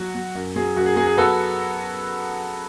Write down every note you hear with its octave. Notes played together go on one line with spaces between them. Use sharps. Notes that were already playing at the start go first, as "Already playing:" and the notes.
Already playing: F#3 F#4
F#3
F#2
F#3 G#4
F#2 F#4
G#4
F#3 G#4
G#4
B3 F#4 A4